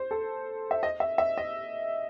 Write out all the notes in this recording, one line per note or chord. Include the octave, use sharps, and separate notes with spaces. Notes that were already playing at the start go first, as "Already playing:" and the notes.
Already playing: C5
A4
E5
D#5
E5
E5
D#5